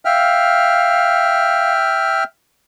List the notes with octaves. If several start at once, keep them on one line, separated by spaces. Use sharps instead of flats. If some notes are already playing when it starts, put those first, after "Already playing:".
E5 F5 G5 F6